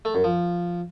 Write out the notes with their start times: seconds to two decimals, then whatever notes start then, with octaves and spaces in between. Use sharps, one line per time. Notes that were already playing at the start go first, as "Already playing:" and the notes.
0.05 A3
0.15 F#2
0.24 F3